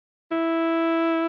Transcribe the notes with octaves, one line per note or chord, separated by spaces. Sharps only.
E4